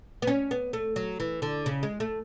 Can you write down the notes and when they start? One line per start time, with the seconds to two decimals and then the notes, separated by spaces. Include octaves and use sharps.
0.22 B3
0.27 C#4
0.51 B3
0.73 A3
0.96 F#3
1.20 E3
1.42 D3
1.66 C#3
1.83 G#3
2.00 A3